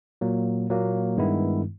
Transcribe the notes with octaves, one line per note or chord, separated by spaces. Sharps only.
A#2 F#3 A#3
A#2 F#3 A#3
G2 D#3 G#3 B3 E4